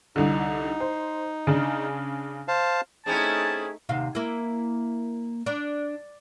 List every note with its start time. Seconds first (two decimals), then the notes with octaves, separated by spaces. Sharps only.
0.16 C2 D3 D#4
0.80 C5
1.47 C#3 D4
2.48 C5 F5 A5
3.06 A3 C4 C#4 D#4 E4 G#4 A5
3.89 D#2 C3 F5
4.15 A#3 E4
5.46 D4